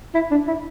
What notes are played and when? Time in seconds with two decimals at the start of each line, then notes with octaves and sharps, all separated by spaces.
0.15 E4
0.31 D4
0.48 E4